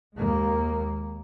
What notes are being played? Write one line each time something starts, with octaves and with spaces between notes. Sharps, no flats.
D#2 D#3 G#3 A#3